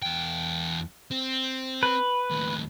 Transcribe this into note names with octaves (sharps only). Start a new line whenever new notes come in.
E2 G5
C4
B4
D#2 A2